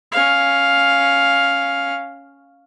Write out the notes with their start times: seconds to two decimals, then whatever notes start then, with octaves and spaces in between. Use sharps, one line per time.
0.12 C#4 F5